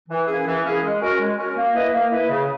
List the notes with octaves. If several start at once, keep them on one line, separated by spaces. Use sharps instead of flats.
E3
A#3 C#4 E4 G#4
E3
A#3 C#4 E4 G#4
G#3
C#4 F#4 A#4
G#3
C#4 F#4 A#4
A#3
E4 B4 D#5
A#3
E4 B4 D#5
C#3